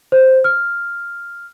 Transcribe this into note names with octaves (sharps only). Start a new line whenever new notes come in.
C5
F6